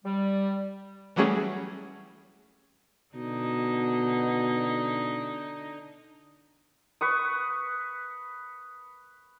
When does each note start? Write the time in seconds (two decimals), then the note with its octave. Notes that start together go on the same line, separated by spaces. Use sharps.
0.05 G3
1.16 E3 F#3 G3 A3 C#4 G#4
3.16 B2 D3 D#4
7.01 B4 C#6 D#6